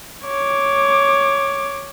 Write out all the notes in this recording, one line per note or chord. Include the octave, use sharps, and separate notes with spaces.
C#5 D6